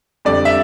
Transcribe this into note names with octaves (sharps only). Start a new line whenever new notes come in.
F2 D3 G3 D5
E5